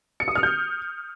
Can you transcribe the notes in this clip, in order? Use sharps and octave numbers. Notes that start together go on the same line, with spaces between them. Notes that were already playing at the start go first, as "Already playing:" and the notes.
C#7
D#6
F6
G6